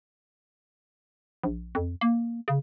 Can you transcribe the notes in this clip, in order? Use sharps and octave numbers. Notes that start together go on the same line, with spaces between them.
A#1
F2
A#3
C#3